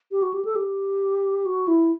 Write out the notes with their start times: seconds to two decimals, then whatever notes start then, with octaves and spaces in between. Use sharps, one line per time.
0.12 G4
0.22 F#4
0.34 G4
0.45 A4
0.56 G4
1.46 F#4
1.68 E4